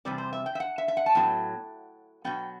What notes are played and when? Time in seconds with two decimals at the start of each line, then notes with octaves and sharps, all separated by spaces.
0.05 E2 C3 G3 C4 D5
0.18 C5
0.33 E5
0.46 G5
0.55 E5
0.60 F#5
0.78 E5
0.88 E5
0.97 F#5
1.06 A5
1.15 A2 F#3 B3 G5
2.24 B2 F#3 B3 G5